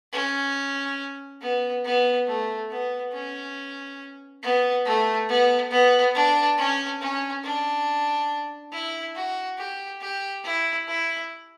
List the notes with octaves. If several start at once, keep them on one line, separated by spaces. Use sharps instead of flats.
C#4
B3
B3
A3
B3
C#4
B3
A3
B3
B3
D4
C#4
C#4
D4
E4
F#4
G4
G4
E4
E4